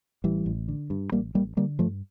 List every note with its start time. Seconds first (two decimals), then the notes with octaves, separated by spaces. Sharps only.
0.24 A1 E3 G3
0.46 A1
0.68 D3
0.90 G2
1.12 A1 G3 A#3
1.34 A1 G3 A#3
1.57 D3 G3 A#3
1.79 G2 F3 A3